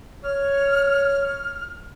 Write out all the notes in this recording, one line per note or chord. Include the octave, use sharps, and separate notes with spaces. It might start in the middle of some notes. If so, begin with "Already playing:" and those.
C#5 F6